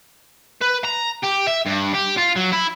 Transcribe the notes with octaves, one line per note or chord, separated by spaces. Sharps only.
B4
A#5
G4
E5
G2
G4
F4
F#3
E4